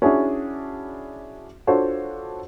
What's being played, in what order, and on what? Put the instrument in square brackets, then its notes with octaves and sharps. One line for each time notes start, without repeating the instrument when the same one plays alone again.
[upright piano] C#4 D4 E4 F#4 G#4
D4 F4 F#4 A4 C5 C#5